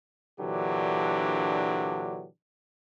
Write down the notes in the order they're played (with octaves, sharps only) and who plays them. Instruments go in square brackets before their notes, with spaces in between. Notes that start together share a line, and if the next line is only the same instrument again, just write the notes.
[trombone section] A#2 D3 E3 F#3 D4 G4